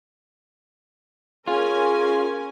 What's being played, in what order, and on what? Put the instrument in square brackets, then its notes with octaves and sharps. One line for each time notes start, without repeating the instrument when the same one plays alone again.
[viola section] C#4 A#4 G#5 [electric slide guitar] F4 [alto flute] G#4